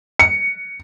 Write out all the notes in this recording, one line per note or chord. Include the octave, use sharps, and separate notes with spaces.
C#7